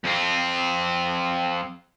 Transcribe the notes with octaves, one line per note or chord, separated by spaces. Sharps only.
F2 C4